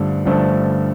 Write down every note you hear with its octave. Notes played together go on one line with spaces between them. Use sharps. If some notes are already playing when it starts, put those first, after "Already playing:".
Already playing: G1 G2 D3 F3 A3
G1 G2 D3 F3 A3